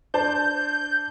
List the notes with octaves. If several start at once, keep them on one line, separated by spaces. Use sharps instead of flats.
D4 C5 A5 G6